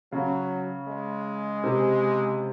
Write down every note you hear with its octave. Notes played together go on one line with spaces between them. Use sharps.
C#3 F#3
G#3
C3